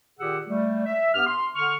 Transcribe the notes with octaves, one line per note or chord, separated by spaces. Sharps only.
A#2 D#3 G4 G#4 F#5 E6
G3 A3
E5
G2 B3 G4 F6
C6
D3 C#6 F6